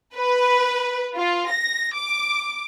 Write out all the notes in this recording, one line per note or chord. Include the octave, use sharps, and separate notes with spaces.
B4
F4
A#6
D6